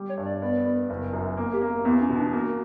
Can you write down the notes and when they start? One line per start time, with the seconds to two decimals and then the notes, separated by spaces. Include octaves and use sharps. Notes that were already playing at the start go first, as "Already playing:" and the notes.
Already playing: G3
0.09 C#5
0.17 G2
0.26 D5
0.41 B3 D5
0.65 B3
0.90 F#1
1.13 F#2
1.37 A#3
1.53 G4
1.61 A#3
1.85 E2 B3
2.01 C#4
2.10 B2
2.18 D4
2.33 A#3 F#4